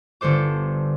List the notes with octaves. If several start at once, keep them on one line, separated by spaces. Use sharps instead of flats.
G1 D3 A4 C5 D6